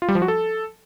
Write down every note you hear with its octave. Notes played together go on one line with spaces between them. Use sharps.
F4
G3
F3
F#4
A4